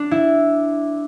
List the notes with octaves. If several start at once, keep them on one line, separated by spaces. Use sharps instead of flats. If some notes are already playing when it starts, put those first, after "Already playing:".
Already playing: D4
E4